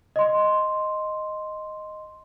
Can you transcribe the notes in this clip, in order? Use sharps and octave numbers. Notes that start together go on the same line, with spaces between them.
D#5 C6